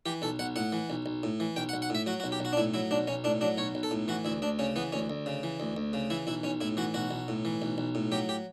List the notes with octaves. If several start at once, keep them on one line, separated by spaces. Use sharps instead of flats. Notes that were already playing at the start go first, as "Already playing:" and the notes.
E3 G4
B1 A4
B1 F#5
A2 F#5
E3
B1
B1
A2
E3
B1 G5
F#5
B1
F#5
A2 E5
F#3 F#4
F#4
B1
G4
B1 F#4
D4
A2 E4
F#3 E4
B1 D4
B1 C#4
A2 D4
F#3 D4
B1 C#5
B1
A4
A2
E3 F#4
D2 E4
D2 D4
C#3 C#4
E3 B3
D2 C#4
D2
C#3
E3
D2
D2
C#3
E3 E4
B1 E4
B1 C#4
A2 E4
E3 F#4
B1 F#4
B1
A2
E3
B1
B1
A2
F#3 G4
G4